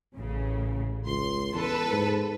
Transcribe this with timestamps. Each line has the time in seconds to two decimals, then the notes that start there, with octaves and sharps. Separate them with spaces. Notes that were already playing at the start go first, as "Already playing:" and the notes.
0.16 A1 C#3
1.06 C#2 C6
1.54 E2 A4 B4
1.92 G#2